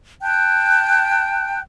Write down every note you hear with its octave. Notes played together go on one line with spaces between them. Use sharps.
G5 A5 F#6 G6